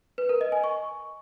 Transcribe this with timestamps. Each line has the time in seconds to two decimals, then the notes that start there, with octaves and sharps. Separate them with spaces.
0.18 B4
0.29 A#4
0.41 D#5
0.52 G#5
0.64 C#6